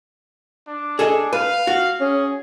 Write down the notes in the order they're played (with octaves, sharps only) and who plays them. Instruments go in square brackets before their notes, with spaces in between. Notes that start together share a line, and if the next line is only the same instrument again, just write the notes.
[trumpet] D4
[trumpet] D4 [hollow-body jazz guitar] G#4 A4 D#5
[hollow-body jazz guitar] B4 [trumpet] F5
[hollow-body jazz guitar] F#4
[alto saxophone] C#4 [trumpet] G#4